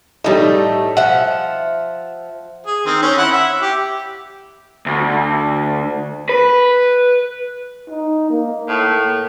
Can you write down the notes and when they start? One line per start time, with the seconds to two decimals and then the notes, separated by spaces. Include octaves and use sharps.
0.24 A2 G3 A3 D#4
0.97 F3 E5 F#5
2.66 G#4
2.86 D#3 C4
3.02 C4 C#4
3.18 E4 F#5
3.32 E5
3.62 G4
4.86 D2
6.29 B4
7.89 D#4
8.30 A#3
8.68 A2